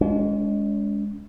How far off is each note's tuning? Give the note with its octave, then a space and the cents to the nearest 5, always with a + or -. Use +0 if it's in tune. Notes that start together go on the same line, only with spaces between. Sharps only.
G#3 +0 C#4 +45